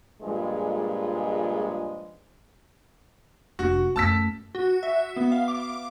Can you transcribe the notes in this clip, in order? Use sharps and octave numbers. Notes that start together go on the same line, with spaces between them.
G2 A#2 F3 G#3
F1 D4 F#4
F#2 A3 A5 E6 B6
F#4
E5
B3
F5
D6